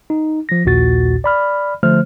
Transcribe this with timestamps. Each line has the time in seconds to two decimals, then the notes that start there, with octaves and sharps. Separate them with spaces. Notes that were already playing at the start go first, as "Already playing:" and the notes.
0.10 D#4
0.49 F3 A#6
0.65 A#1 D#2 A#2 F#4 A6
1.24 D5 B5 F6
1.83 D3 F3 A3 C5 F6